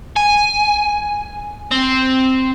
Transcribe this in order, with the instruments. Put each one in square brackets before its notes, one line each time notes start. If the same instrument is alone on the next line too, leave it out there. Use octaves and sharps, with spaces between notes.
[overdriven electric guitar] G#5
C4